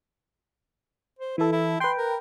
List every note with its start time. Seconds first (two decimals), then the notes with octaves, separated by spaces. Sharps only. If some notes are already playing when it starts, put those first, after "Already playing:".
1.19 C5
1.38 E3 E4 A4
1.52 E4
1.80 B4 G5 C6
1.98 A#4